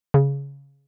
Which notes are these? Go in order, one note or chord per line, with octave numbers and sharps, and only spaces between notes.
C#3